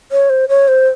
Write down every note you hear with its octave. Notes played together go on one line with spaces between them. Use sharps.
C#5
C5
C#5
C5